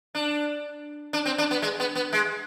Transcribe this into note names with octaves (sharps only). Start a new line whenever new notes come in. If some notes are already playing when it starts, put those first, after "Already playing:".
D4
D4
C4
D4
B3
G#3
B3
B3
G#3